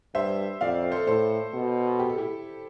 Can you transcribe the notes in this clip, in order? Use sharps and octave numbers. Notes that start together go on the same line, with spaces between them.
G2 C5 E5
F2 D5 F5
A4 C5
A2 A4 C5
B2
G4
A4
E4 G4